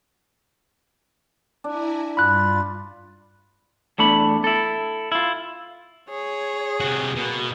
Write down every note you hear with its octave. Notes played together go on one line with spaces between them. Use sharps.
D4 E4 G#5 A#5
G2 F4 B5 F#6 A6
E2 A3 D4 B5
E4 A4
E4 F4
G#4 C#5
C3 F#4
B2 A#3 F#4